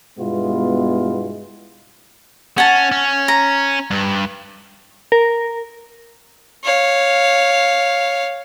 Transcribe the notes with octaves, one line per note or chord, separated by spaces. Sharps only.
G2 B2 G#3 B3 E4 F4
C#4 F#5 A5
C#4
A#5
G2
A#4
C#5 F5